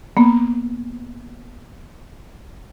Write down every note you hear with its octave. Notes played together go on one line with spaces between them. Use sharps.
A#3 B3